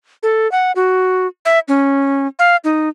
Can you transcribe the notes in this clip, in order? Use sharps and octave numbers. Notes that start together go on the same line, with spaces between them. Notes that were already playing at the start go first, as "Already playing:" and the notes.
A4
F#5
F#4
E5
C#4
F5
D#4